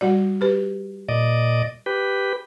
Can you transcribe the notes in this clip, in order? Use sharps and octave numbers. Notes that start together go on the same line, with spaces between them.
G3 F#4 D5
G4 B4
A#2 D5 D#5
G4 B4